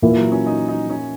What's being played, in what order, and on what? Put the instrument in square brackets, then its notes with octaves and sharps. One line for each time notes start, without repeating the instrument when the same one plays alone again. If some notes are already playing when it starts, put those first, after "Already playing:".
[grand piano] A#2 A#3 E4 [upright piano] E3
[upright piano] F#3
C#4
D#4
D#4
C#4